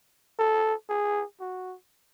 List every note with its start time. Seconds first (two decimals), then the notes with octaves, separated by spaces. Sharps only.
0.39 A4
0.89 G#4
1.40 F#4